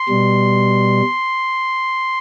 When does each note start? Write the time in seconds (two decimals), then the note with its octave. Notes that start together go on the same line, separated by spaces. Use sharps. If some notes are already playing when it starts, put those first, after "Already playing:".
Already playing: C6
0.09 B2 G3